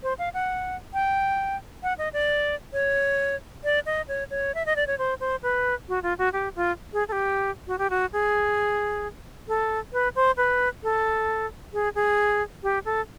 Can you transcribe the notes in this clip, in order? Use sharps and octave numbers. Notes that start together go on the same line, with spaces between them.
C5
F5
F#5
G5
F#5
D#5
D5
C#5
D5
D#5
C#5
C#5
E5
D#5
D5
C#5
C5
C5
B4
F#4
F4
F#4
G4
F4
G#4
A4
G4
F#4
G4
F#4
G#4
A4
B4
C5
B4
A4
G#4
G#4
G4
A4